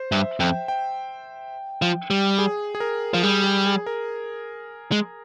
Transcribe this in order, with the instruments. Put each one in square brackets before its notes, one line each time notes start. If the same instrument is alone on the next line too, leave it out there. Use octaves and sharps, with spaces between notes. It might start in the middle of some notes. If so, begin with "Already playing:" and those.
Already playing: [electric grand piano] C5
[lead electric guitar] G2 [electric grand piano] E5
[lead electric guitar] F2 [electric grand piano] G5
[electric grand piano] G5
[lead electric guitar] F3
G3
[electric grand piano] G#4
G#4
A#4
[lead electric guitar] F3
[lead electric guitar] G3 [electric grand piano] G#4
[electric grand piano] G#4
G#4
A#4
[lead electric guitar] G#3